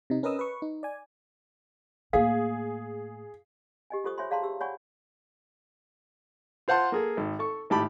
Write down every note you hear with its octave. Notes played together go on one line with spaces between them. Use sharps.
C3 D#4
C#4 A#4 B4 D#5 D#6 E6
B4 C#6
D#4
D5 G#5
A2 A#3 G#4 F5
G4 D#5 G#5
F4 G4 A4 C5 C#6 D#6
C5 C#5 E5 G#5 B5 C6
G#4 D5 F5 A5 A#5 C6
G4 E6
C#5 D5 F#5 G#5 B5 C#6
F4 C5 F#5 A5 C6
A#3 G#4 A4
G#1
A4 C#6
G#1 A2 G4 A5 B5